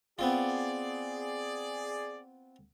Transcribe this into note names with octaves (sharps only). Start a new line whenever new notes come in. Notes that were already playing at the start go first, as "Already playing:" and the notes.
B3 C4 F4 G#4 D5